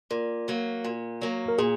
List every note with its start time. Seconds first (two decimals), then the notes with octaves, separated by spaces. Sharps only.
0.11 A#2 A#4
0.48 F#3 A#3
0.84 A#2
1.21 F#3 A#3
1.49 A#4
1.58 A#2 G#4